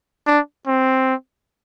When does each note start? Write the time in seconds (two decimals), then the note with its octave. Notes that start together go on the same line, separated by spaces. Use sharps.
0.27 D4
0.67 C4